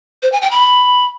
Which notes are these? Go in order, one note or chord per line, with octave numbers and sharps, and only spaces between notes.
C5
G#5
G5
B5